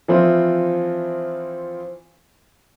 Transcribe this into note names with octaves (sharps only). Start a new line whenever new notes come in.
E3 F3 C4 E4 F4